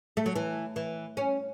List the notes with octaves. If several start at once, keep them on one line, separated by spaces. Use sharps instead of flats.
A3
F#3
E3
E3
C#4